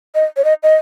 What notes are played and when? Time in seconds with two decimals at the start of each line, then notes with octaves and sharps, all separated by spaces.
0.15 D#5
0.37 C#5
0.45 D#5
0.63 D#5